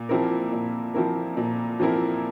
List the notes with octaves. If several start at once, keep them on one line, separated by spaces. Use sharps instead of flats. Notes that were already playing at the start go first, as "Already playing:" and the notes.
Already playing: A#2
F3 C4 E4 A#4
A#2
F3 C4 E4 A#4
A#2
F3 C4 E4 A#4